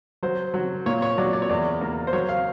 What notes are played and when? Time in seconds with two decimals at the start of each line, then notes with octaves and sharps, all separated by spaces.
0.23 F#3 C5
0.54 F#3
0.86 A#2 C#5
1.02 C#5
1.18 F#3 D5
1.33 D5
1.42 C#5
1.49 E2 D5
1.81 A#3
2.07 C5
2.13 F#3 C#5
2.29 F5